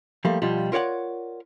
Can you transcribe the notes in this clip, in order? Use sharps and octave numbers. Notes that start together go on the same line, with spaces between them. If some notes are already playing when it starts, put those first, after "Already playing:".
F3 G3 A3 A#3
B2 F3 G3 F4
F4 A#4 C#5 D5 F#5